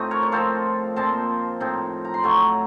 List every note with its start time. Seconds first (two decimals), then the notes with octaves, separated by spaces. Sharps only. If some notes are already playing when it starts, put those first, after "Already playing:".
Already playing: A2 A3 C4 D#4 F4 D#5
0.11 A#4 C#5
0.23 C#5
0.32 F3 C4 F4 A4 C5
0.96 A#2 F3 C4 A5 C6
1.60 A2 F3 C4 D#4
2.05 A#5
2.14 C6
2.23 A2 F#3 A3 A#5 C#6